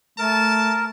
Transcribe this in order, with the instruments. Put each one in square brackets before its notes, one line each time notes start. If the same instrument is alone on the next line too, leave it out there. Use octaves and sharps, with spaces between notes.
[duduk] A3 [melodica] A#4 [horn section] A5